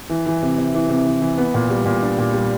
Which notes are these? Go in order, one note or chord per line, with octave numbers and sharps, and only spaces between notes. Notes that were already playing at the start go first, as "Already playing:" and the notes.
E3
E3
C3
C3
E3
C3
E3
E3
B3
A#2
G3
A#2
D4
A#2
G3